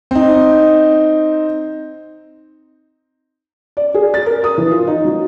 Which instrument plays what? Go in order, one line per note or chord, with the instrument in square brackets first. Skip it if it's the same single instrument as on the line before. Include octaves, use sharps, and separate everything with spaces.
[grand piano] C4 D#4
[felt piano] D5
G#4
A6
A#4
D#6
E3
F4
D#4
F#3